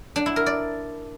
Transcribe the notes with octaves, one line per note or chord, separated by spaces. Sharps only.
D4
E4
A#4
D5